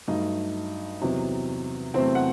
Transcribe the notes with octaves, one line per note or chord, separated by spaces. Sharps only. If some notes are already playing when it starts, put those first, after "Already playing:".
G2 F#3 A3 D#4 D#5
E2 C3 F#3
E2 C3 F#3 A3 C4 C5
F#5